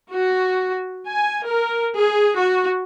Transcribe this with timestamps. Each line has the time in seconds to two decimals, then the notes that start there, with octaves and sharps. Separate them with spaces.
0.11 F#4
1.08 G#5
1.47 A#4
1.96 G#4
2.38 F#4